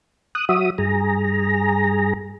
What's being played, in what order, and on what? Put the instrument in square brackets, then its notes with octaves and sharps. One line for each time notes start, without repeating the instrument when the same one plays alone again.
[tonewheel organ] D#6 F#6
F#3 F#4 E5 D#6
G2 G#4 A#5